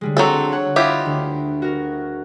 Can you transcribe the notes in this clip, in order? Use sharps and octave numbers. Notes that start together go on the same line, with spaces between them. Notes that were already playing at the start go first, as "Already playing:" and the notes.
D3 G3 G#3
F#3 C4 F#4 A4
C#5 F#5
E4 F4 G4 D#5
D2
F#4 A#4